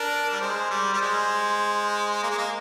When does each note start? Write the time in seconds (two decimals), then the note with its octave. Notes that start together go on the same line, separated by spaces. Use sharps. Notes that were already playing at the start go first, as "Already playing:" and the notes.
Already playing: D4 A#4
0.32 G3
0.40 G#3 C5
0.70 G3
0.94 G3
1.01 G#3
2.22 A#3 D#5
2.31 G#3
2.38 A#3